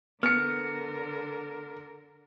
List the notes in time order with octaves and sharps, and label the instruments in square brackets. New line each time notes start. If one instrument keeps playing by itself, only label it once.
[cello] D3 A#4 [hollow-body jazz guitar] B3 [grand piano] F6 C#7